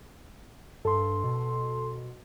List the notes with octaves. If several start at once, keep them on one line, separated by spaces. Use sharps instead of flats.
G2 A4 C6
B2